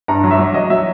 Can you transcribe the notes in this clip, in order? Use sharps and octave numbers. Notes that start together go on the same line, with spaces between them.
G2 A#5
F#3
E5
F#3
F#3 D#5
F#3 E5